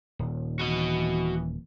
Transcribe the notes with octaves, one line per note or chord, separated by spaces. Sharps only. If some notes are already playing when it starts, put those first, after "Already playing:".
D#1
E3 F#4 D#5